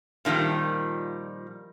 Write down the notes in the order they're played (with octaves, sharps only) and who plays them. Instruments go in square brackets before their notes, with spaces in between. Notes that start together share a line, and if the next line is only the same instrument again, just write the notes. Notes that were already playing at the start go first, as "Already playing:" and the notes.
[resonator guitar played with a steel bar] A#2 D#3 F3 G3